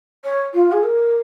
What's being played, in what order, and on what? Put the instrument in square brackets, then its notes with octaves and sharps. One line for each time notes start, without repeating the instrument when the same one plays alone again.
[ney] C#5
F4
G#4
A#4